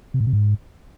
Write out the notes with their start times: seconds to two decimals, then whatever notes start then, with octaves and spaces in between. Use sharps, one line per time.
0.14 C3
0.20 A2
0.27 C3
0.33 G#2